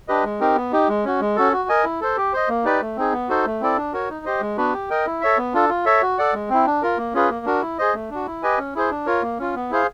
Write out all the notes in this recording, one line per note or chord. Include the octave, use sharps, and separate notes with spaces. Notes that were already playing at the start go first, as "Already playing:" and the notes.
D4 G4 B4 D#5
G#3
C4 D#4 G4 A#4
B3
D#4 G4
G#3
C#4 F#4
G#3
C#4 F#4 A4
F#4
A#4 D#5 G#5
E4
A4 C5
G4
C5 D#5
A#3
D#4 G4 B4 D5
A3
C4 D#4 G#4
B3
D#4 F#4 A4 C5
A3
C4 E4 A4 D5
D4
F#4 A#4 C#5
D#4
G4 C5 D#5
G#3
B3 D4 F#4 B4
G4
A#4 D#5 G5
E4
A4 C#5 E5
B3
D4 F4 A4
F4
A4 C#5 E5
F#4
A4 D5 F#5
G#3
C4 E4
D4
F4 A#4
A#3
C#4 F4 G#4 B4
A#3
D4 F#4 A#4
E4
G#4 C5 D#5
A3
D4 F#4
E4
G4 B4 D#5 G#5
C#4
E4 G#4 C5
D4
F4 A#4 C#5
A#3
C#4 F4
B3
E4 G#4 C5 F5